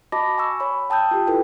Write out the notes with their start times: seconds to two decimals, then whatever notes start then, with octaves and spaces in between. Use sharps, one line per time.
0.12 F#4 D#5 A5 B5 D6 A#6
0.38 G#5 C#6 E6
0.60 C#5 B5
0.90 G5 A5 D#6 E6 G6
1.11 F4 G4
1.27 E4 A4 B4 G5